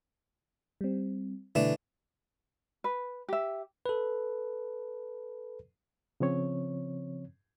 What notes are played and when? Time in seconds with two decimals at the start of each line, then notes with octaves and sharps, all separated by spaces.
0.81 G3 C4
1.55 B2 D3 E3 A3 D4
2.84 B4
3.29 G4 E5
3.86 A4 B4
6.20 C#3 F3 C4 C#5